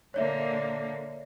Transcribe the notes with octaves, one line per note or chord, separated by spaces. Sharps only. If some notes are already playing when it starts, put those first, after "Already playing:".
A#2 D3 A#3 C#5 D5 E5